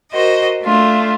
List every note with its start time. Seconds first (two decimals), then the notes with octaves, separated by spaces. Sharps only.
0.12 F#4 A#4 C5 D#5
0.63 A3 D4 F4